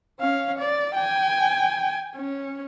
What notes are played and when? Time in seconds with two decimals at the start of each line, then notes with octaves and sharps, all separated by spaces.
0.20 C#4 F5
0.59 D5
0.95 G5 G#5
2.16 C#4